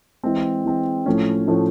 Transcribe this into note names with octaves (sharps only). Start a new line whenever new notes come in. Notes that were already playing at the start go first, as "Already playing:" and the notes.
E3 G#3 C4
E3 G#3 C4
A2 F3 A3 C#4
A2 F3 A3 C#4